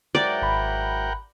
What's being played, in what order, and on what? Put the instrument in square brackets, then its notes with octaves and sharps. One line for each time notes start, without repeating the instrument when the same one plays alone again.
[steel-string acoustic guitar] G#2 F#3 E4 [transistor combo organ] A#4 F#5 G5 [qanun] D5
[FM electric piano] G#1 B5